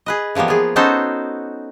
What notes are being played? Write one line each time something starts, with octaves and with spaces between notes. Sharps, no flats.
G#4 B4 D#5
E3 F3 G3 A#3 B3
F4 G#4
B3 C#4 D#4 F#4 A4 C5